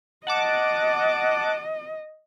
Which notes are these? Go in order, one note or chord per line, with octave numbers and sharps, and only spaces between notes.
D#5 F#5 A5 D6